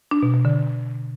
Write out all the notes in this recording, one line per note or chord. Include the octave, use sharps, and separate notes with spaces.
D4
B2
B2
D3